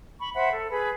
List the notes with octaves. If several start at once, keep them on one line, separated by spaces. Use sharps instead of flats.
B5 C#6
C5 E5 F#5 B5
A4
G#4 B4 B5